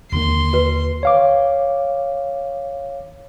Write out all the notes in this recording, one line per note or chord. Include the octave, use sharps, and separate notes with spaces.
D#2 D3 A#3 C6
F#4 B4
C#5 F5 D6